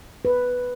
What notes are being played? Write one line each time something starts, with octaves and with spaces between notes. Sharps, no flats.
B4